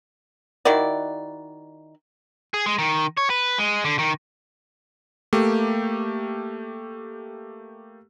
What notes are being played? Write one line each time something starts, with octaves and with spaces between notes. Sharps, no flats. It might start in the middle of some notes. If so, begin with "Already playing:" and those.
D#3 E4 F#4 D5
G#4
G#3
D#3
C#5
B4
G#3
D3
D#3
A3 A#3 G4